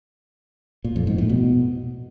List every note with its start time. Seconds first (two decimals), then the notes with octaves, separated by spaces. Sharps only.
0.84 A#2
0.96 F2
1.07 G#2
1.18 A2
1.30 B2